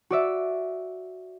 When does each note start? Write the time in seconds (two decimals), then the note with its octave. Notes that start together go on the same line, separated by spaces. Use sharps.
0.10 F#4 D5 E5